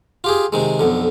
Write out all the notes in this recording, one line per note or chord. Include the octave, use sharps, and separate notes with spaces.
F4 G4 G#4
C3 D#3 G#3
B1 F2 D3